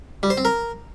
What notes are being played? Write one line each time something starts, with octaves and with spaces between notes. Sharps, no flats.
G3
C5
C4
A#4